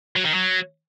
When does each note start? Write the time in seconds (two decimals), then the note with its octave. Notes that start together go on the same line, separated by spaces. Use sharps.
0.16 F#3
0.25 D#3
0.34 F#3